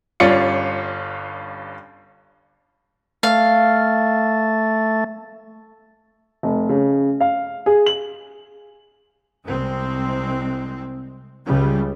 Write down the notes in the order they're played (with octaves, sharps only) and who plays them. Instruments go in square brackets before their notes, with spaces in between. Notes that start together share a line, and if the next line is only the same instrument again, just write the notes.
[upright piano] G1 G2 C#4 F4 D5 C#7
[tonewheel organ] A3 [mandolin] F5
[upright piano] F1
C#3
F5
G#4
F#7
[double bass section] C2 G#3 C4
C#2 C#3 G3